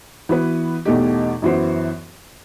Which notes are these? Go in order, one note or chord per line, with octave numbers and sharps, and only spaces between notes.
E3 B3 F#4 B4
E2 B2 A3 D#4 G4
F#2 E3 B3 F#4 C5